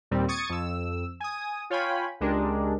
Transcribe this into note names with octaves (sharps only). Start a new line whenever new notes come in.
D#2 A#2 G3 C4
C#6 D#6 G#6 A6 C#7
F2 E6
G#5 D#6
F4 C#5 F5 G5 G#5 B5
C#2 G#3 D4 G4 A#4